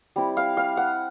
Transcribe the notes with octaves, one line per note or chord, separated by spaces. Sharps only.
G3 C4 E4
F5
F5
F#5